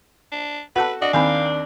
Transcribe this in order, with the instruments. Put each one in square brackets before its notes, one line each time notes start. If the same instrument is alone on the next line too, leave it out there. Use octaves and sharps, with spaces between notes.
[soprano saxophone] D4
[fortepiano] F#4 A4 F#6 [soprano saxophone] B4 [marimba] F#5 A5
[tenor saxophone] D4 [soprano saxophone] F#4 [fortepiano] D#5
[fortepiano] D#2 D#3 C4 [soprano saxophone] F5 [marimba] G#5 B5